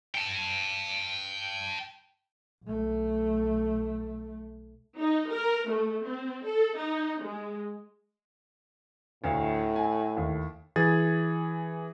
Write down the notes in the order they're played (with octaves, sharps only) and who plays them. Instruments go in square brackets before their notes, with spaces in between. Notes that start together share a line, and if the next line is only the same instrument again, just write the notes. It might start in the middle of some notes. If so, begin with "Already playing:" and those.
[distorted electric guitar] G5 A5
[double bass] B1 A3
[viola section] D#4
A#4
A3
C4
A4
D#4
G#3
[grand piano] D2 F5 [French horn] A2
[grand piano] G#5
D#2
[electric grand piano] E3 G#4 G#6 A6